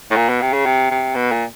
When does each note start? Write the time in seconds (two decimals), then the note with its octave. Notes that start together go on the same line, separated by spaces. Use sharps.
0.11 A2
0.16 A#2
0.29 B2
0.41 C3
0.53 C#3
0.66 C3
0.91 C3
1.15 B2
1.32 A#2